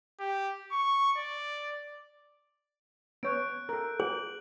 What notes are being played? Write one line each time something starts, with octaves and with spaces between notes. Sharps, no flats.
G4
C#6
D5
B3 C#5 F#6 G6 D7
A4 A#4
G#4 F#7